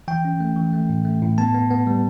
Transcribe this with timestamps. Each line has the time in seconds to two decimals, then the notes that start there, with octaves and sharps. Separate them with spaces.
0.08 E3 G5
0.25 C#4
0.40 A3
0.56 E3
0.73 A3
0.90 A2
1.05 A3
1.22 A2
1.38 B3 A5
1.54 B3
1.70 B3
1.87 G3